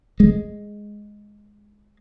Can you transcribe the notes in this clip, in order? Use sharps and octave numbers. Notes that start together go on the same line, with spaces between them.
G#3